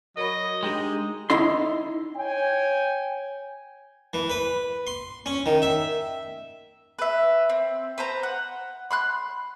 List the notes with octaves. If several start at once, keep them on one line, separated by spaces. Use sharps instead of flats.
F#3 A#4 C#5 D#5 B5
G#3 D4 D#4 G4 G5
D#4 E4 C6
C#5 G5 G#5
E3
B4
C6
C#4
D#3
E5
B4 E5
C4
B4 C5 A#5
F#5
B5 C6 F#6